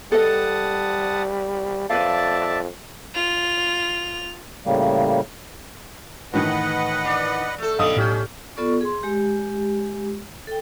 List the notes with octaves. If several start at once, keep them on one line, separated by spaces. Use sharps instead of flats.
G3 A4 B4 D#5 F#5 A5 D#6
F2 B4 D5 E5 F5 A5
F4 F7
A2 C#3 G3 A#3
A2 D#3 E3 B4 D#5 F#5
D4
A3 A4
B1 D3 G3 D#5 F5 D#6
A2 C#4 G4 G6
B3 F4 A4 D5 C#6
G#4 C6
G#3 G4
A4 G5